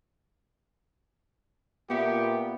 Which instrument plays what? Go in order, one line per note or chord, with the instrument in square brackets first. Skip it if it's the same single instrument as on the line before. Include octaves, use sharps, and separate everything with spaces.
[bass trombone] A#2 [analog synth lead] B3 [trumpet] G4 [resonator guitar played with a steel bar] E5 F#5